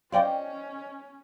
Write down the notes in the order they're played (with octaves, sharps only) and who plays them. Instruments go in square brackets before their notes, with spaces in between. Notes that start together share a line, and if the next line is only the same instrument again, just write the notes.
[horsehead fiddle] C#4 [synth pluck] F4 D5 G5 [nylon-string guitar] C5 D#5